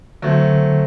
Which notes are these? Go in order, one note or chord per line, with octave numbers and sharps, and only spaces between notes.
D3 F#3 A3 C4